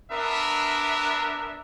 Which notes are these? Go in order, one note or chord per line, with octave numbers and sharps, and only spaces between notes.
B3 D4 A#4 E5